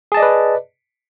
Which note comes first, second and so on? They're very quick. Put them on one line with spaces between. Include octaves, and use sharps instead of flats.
G#4 A5 D#5 D5 B4